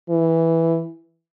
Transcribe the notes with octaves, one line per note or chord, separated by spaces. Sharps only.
E3